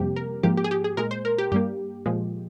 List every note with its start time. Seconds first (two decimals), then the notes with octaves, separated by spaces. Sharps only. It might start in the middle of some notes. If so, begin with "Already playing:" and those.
Already playing: F2 C3 G3 A#3 G4
0.16 A#4
0.43 G#2 F3 A#3 G4
0.57 G4
0.64 G#4
0.71 G4
0.84 G#4
0.97 A#2 G#3 A#4
1.11 C5
1.25 A#4
1.38 G4
1.52 G2 G3 A#3 G4
2.06 A#2 F3 G#3